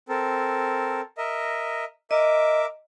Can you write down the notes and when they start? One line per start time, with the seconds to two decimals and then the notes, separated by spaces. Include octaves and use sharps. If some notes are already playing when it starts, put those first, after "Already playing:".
0.09 C4 A4 A#4
1.18 A#4 D#5 E5
2.11 A#4 D#5 E5 D6